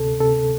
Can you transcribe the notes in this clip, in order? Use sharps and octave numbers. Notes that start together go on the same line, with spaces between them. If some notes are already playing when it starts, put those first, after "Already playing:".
Already playing: D2 C3 A4
C3 A4